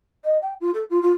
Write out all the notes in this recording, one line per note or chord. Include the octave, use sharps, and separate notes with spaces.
D#5
G5
F4
A4
F4
F4